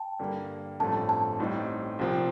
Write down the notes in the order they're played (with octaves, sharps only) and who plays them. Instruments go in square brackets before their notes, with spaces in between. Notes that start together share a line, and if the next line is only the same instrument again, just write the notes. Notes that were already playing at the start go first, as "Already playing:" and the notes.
Already playing: [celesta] G5 A5
[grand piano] G2 D3 G3 A#3
[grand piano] A1 G2 F3 A3 C4 [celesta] A5
[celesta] A5
[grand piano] A1 A2 G3 C4 D#4
C2 A#2 F3 C4